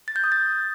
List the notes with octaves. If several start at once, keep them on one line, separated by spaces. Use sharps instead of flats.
A6
G6
D#6
A6